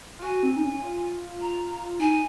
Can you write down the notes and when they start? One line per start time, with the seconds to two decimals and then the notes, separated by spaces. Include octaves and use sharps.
0.19 F4
0.22 F#4 G#5
0.43 C4
0.56 D#4
0.62 C#4
0.82 F4
1.41 A#5
2.00 D#4 G#5